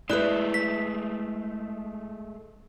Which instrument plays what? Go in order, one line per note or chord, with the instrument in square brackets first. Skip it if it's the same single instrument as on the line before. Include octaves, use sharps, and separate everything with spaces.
[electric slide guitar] G#3 A3 [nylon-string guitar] E4 B4 [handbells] D5 F#6
[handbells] B6